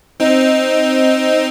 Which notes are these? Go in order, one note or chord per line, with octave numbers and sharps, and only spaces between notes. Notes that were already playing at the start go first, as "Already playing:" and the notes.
C4 D#4